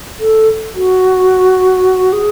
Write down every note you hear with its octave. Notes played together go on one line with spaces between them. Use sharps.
A4
F#4
G#4